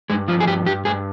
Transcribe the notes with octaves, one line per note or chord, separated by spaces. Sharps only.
G2 G#3
F3 F4
G#4
G2 G4
G2 G4
G2 G#4